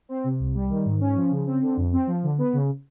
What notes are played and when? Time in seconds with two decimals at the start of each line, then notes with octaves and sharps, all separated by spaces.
0.09 C4
0.24 C3
0.39 C2
0.55 G3
0.69 D#3
0.85 G#2
1.01 C#4
1.16 F3
1.31 C#3
1.46 C4
1.62 D3
1.77 F2
1.92 C4
2.07 F3
2.23 D3
2.38 B3
2.53 C#3